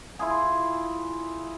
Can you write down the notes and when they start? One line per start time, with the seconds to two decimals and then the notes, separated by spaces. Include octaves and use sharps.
0.19 E4 F4 G#4